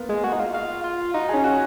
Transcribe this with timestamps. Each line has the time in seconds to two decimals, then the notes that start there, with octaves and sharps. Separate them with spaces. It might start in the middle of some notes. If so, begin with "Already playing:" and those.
Already playing: A#3 B3 F4
0.09 G#3
0.24 F#4
0.33 D#4
0.40 F4
0.54 F4
0.84 F4
1.14 D#4 F#4
1.29 G#4
1.34 C#4
1.44 F#4